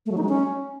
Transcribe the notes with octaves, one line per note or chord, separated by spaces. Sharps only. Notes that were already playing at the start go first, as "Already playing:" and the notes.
A3
F#3
D#4
G#3
C#4